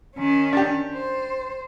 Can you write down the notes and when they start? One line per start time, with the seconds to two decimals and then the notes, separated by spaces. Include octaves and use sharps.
0.17 D#3 C#4
0.53 D4 G4
0.94 C5